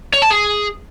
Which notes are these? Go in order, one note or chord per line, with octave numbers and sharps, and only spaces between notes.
C#5
A5
G#4